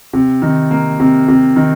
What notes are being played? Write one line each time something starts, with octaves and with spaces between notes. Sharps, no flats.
C3
D#3
A#3
C3
C3
D#3